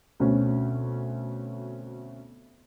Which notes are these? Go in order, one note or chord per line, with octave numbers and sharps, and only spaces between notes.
D2 B2 C4 C#4